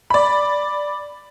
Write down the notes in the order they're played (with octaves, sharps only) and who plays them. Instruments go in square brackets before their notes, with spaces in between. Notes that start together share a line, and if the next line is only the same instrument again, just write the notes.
[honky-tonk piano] D5 B5